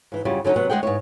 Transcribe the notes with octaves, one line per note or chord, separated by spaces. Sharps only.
G#2 E3
F#2 C#3 G3 F4
D3 F#3 G3 C#4 D#4
C3 F#3 B3 F#5
D2 G#3 C4 G#4 F#5 G5
G#2 B3 E4 C#5